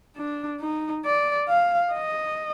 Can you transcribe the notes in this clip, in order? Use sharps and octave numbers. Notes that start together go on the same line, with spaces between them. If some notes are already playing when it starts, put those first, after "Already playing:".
D4
D#4
D5
F5
D#5